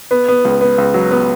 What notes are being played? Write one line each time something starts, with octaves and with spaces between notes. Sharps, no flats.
B3
B3
C#2
B3
C#2
F#3
B3